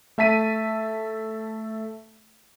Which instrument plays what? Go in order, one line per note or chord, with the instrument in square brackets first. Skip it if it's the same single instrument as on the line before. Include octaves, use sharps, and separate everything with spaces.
[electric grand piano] A3 E5 A5 B6 D#7